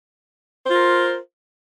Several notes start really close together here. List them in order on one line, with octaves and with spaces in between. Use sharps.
C5 F4 A#4